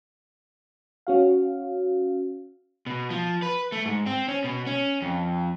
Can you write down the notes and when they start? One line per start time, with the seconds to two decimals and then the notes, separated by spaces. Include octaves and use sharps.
1.07 C#4 F#4 F5
2.86 B2
3.10 F3
3.42 B4
3.72 A3
3.86 G#2
4.06 C4
4.28 C#4
4.44 B2
4.67 C#4
5.02 F2